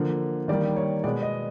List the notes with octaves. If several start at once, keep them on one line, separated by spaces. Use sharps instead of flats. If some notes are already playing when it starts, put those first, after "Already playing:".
Already playing: D3 F3 A#3
D#3 G3 A#3 D5
C#5
B2 G#3 B3 D5
D#5